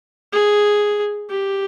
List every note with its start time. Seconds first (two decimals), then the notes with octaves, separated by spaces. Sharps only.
0.33 G#4
1.30 G4